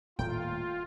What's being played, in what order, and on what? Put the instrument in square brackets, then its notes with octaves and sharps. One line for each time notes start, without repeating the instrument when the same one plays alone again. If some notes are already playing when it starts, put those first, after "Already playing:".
[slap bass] D#1 A3 [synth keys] A2 G5 [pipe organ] F4